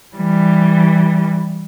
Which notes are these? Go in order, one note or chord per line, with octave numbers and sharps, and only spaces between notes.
E3 G3